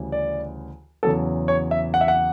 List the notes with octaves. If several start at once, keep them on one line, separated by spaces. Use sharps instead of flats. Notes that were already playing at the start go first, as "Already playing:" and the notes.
Already playing: D2 C#3 E3 G3
D5
E2 C#3 F#3 A4
C#5
E5
F#5
E5
F#5